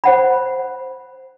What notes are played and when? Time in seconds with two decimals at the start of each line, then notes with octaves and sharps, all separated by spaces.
0.04 C5 F#5 B5